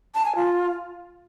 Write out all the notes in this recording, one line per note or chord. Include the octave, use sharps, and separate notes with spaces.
A5
G#5
F4